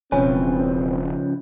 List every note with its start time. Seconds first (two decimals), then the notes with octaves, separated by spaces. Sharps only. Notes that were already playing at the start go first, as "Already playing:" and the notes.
0.12 E1 C#3 F3 C4 C#4 B4